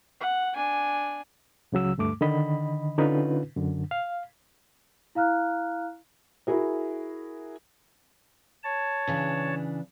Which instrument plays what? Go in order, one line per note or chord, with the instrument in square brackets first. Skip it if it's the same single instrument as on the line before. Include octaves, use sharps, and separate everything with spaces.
[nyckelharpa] F#5
D4 G#5
[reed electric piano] C#2 C#3 F#3 E6
D2 G2 A3 D6
D3 D#3 D#5 B5
D3 C#4 D#4 F4 B4
F#2 D3
F5
[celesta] E4 F5 A#5 F6 F#6
[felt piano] E4 F#4 G#4 A#4
[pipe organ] C#5 A5
[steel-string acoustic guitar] C#3 E3 D4